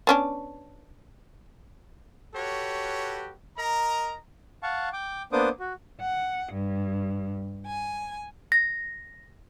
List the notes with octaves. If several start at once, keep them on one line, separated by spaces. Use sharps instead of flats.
B3 C#4 D4
F#4 G4 A4 B4 C#5
A#4 D#5 A#5
F5 F#5 A5 C#6
G5 D6
A#3 B3 D4 C5 D6 D#6
F#4
F#5
G2
G#5
A#6